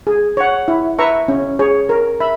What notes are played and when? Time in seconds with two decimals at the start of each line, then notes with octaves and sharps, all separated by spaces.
0.07 G#4
0.37 C#5 F#5
0.68 E4
0.99 B4 E5 A#5 C#6
1.28 C#4
1.59 G#4 C#5
1.89 A#4
2.20 E5 B5